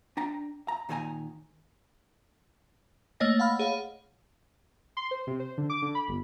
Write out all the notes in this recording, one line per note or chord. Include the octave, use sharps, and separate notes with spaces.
D4 G5 A#5
A#5
A#2 D#3 A4 C5 G#5 A#5
A3 A#3 C#5 D#5 A#6
F5 F#5 B5 F6
G#4 C#5 F5
C6
C5
C3
C5
D3
D6
D3
B5
G1